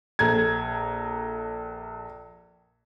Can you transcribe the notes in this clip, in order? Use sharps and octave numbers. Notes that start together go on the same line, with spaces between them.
A#1 A4 A#5 G#6